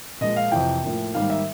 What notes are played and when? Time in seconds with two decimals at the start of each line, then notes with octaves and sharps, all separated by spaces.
0.21 A#2 F3 G#3 D#5
0.36 F5
0.52 F2 C3 E3 G5
0.83 A2 F3 A#3
1.14 G#2 D#3 G3 A#3 F5
1.30 E5